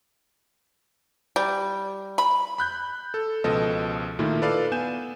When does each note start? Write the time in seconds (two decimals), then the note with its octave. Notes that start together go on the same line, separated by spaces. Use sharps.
1.36 G3
2.18 B5
2.58 B5 F#6 G6
3.14 A4
3.44 C#2 B2 F3 A4 D#5
4.19 A#2 D#3 A3 E4 F4
4.42 A4 B4 D5 F5
4.72 B3 G#5 G6 E7